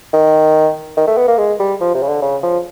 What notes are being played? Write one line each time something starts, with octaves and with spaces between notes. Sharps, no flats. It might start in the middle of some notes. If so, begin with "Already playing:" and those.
D#3
D#3
A3
B3
A#3
G#3
G3
F3
C3
C#3
D3
C#3
F3